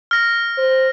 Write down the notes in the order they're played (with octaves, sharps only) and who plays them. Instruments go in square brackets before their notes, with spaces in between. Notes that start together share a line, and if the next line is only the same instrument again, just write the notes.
[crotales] F6 A#6
[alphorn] C5